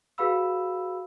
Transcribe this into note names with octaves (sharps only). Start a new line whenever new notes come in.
F#4 G#4 B4 F5 B5 E6